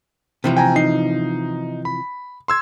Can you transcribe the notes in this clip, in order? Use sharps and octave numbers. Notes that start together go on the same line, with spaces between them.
C3 E3 F3
G5 G#5 A#5
D#4 C7
B5
C6 E6 G#6